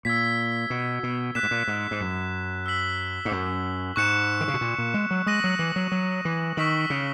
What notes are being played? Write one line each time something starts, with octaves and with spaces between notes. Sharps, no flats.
A#2 E6 G#6 B6
B2
B2
A#2 F#6 B6 E7
G#2
A#2
G#2
G#2
F#2
E6 B6 F#7
G#2
F#2
G#2 C#6 F#6 C#7 E7
D#3
C#3
B2
A#2
A#2
G#3
F#3
G#3 D#6 A#6 D#7 F#7
F#3
E3
F#3
F#3
E3
D#3 C#6 E6 B6 F#7
C#3